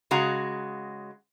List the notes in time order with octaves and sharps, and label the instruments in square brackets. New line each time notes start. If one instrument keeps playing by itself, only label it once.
[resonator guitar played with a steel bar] C#3 G#3 F#4 A#5